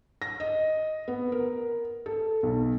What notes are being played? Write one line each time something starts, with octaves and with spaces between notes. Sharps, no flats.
A#6
D#5
B3
A#4
A4
B1